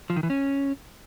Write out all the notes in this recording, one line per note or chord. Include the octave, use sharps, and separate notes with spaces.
F3
D#3
E3
C#4